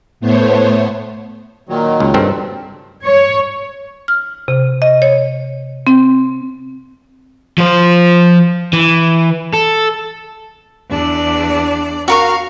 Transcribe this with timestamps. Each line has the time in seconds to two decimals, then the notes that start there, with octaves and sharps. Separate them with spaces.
0.20 A2 A3 B3 C5 C#5
1.69 A#2 D#3 F#3
2.00 C#2
2.14 G2 C4 A4
3.05 C#5
4.08 F6
4.48 C3
4.82 D#5
5.02 C#5
5.87 C4
7.58 F3 C5
8.73 E3
9.53 A4
10.89 E2 D4 D5
12.08 F#4 A#4 F5 C#6